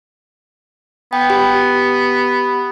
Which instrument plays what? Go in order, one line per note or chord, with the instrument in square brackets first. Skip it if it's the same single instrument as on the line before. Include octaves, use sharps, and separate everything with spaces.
[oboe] B3 [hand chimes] G5
[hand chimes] G4